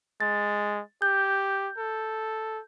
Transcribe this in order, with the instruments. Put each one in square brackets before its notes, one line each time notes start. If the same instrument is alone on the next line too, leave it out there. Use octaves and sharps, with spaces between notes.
[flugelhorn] G#3 [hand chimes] A6
[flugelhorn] G4 [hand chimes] G6
[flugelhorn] A4